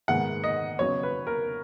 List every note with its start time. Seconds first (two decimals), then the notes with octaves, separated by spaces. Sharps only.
0.08 G#2 D#3 G#3 B3 F#5
0.44 D#5
0.79 C#3 F#3 B3 C#5
1.03 B4
1.27 A#4